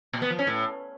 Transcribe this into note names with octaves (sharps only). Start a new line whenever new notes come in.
A#2
B3
F3
C#4
A2